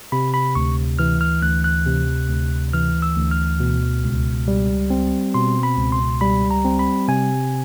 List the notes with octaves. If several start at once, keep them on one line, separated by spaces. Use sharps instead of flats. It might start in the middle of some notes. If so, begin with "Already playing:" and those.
C3 B5
B5
D2 C#6
E3 F6
F6
D2 F#6
F#6
C3
D2
E3 F6
E6
D2
F6
B2
C#2
G3
C4
B2 C6
B5
C#2
C6
G3 B5
A#5
C4
B5
C3 G#5